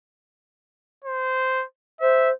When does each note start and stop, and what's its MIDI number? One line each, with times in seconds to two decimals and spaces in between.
1.05 1.65 72
2.01 2.32 72
2.01 2.30 76